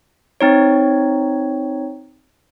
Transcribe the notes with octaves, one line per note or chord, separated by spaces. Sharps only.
C4 D#4 C#5